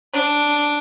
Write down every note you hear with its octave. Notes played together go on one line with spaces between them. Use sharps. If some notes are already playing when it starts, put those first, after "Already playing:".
D4